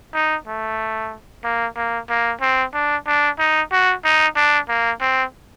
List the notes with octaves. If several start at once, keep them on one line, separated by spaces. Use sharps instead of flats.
D#4
A3
A#3
A#3
A#3
C4
D4
D4
D#4
F#4
D#4
D4
A#3
C4